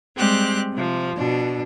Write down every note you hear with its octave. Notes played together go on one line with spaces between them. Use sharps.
G3 G#3 C4 G4 F#6
C3 F3
B2 D4